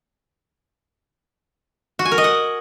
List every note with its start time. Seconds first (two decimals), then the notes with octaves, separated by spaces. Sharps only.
1.99 F#4
2.05 G#5
2.12 A#4
2.18 D#5
2.24 F#5